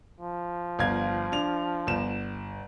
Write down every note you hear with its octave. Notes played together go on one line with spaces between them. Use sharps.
F3
G1 F5 G#6
D4 F7
G1 E7